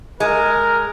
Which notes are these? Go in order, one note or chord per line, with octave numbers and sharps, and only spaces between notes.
G#3 A#4